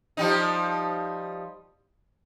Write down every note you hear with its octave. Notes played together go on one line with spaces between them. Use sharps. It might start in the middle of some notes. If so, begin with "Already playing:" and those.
F3 G3 D#4